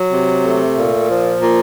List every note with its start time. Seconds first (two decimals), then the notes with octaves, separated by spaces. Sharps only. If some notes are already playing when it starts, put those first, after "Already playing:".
Already playing: F#3
0.10 C3
0.43 A3
0.76 A#2
1.08 F3
1.41 A#2